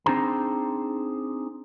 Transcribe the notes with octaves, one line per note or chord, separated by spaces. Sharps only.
C4 D4 D#4 G#4 C5 A#5